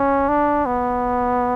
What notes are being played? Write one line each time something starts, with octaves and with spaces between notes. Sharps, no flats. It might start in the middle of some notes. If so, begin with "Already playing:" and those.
Already playing: C#4
D4
B3